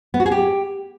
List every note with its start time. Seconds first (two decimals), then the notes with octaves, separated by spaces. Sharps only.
0.14 B3
0.20 F#4
0.26 G#4
0.32 G4